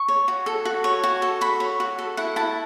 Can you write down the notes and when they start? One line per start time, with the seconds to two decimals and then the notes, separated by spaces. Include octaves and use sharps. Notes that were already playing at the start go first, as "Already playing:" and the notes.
Already playing: C#6
0.08 C#5
0.28 F#4
0.46 A4
0.65 F#4
0.84 C#5
1.04 F#4
1.22 A4
1.41 F#4 B5
1.60 C#5
1.80 F#4
1.99 A4
2.17 E4 F#5
2.36 E4 A5